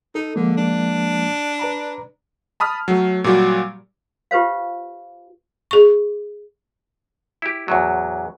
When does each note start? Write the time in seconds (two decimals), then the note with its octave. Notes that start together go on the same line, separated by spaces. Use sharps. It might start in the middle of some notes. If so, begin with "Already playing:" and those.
0.15 D#4 A4
0.36 D3 F3 G#3 A#3
0.57 D4
1.59 B4 A#5 B5
2.60 A5 B5 D#6 F6
2.88 F#3 A3
3.24 A#2 F#3 G3 F#4 G4
4.31 F4 G4 B4 C5 F5
5.71 G#4 C#6
7.42 E4 G4
7.68 E2 A2 F#3